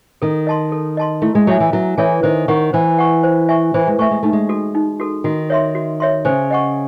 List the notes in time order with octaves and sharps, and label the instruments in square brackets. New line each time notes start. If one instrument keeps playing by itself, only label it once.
[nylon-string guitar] D#3 [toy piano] A4
[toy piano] D#5 A5 C6
A4
D#5 A5 C6
[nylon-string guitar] A3 [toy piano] E4
[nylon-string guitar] G#3
[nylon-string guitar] F#3 [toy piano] A4 C#5 E5 G#5
[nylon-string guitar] E3
[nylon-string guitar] F#3 [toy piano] E4
[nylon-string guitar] E3 [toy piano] A4 C#5 E5 G#5
[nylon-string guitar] D#3 [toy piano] C5
[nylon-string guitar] D#3 [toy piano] F#5 C#6
[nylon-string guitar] E3 [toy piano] C5
[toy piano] F#5 C#6
C5
E5 G#5 C#6
[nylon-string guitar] E3 [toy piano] C5
[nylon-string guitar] G#3
[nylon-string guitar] A3 [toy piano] E5 G#5 C#6
[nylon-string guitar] G#3
[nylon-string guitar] A3 [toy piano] D#4
[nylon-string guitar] G#3
[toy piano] F#4 A4
D#4
F#4 A4
[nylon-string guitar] D#3 [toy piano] F#4
[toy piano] C#5 E5 C6
F#4
C#5 E5 C6
[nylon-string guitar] C#3 [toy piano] C5
[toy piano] D#5 F#5 C#6